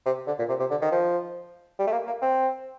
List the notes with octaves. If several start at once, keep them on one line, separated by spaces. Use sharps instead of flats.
C3
D3
A#2
C3
C3
D3
D#3
F3
G3
A3
A#3
A#3
C4